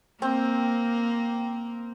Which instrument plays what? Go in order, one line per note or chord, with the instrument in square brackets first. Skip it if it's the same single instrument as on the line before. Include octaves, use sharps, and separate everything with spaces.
[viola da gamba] A#3 [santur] C4